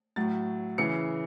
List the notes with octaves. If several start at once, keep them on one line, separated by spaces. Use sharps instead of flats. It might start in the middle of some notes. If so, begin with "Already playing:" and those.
A2 F#3 A6
C#3 E3 C#7